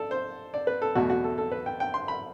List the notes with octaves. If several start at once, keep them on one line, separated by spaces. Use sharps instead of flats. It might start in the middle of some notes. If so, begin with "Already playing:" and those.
Already playing: A4 D5
C5
D5
B4
A4
E2 B2 A3 F#4
F#4
A4
A4
B4
G5
G5
C6
B5